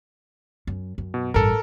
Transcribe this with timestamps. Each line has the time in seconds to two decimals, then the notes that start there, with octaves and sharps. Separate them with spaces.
0.67 F#2
0.98 F#2
1.14 B2
1.34 A1 G2 A4 A#4